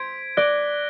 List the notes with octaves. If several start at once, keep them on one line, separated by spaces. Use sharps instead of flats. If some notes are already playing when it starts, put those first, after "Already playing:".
Already playing: C5 G#6 B6 D7
D5 F#6 A#6 D7 G7